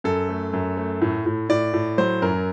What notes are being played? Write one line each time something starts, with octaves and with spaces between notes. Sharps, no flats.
F#2 A4
A3
F#2
A3
A2
A2
A2 D5
A2
F#3 C5
F#2 A#4